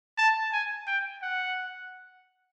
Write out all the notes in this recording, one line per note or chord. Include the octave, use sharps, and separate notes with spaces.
A5
G#5
G5
F#5